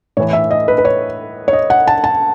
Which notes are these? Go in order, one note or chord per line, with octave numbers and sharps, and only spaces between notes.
A2 E3 C#5
E5
D#5
B4
B4
C#5
C#5
D#5
F#5
A5
A5